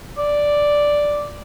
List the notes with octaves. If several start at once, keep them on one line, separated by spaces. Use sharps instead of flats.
D5